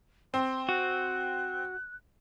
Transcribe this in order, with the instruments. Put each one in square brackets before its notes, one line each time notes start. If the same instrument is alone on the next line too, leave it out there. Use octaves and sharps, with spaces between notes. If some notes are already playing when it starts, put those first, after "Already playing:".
[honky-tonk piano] C4 [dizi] C6
[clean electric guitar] F#4 [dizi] F#6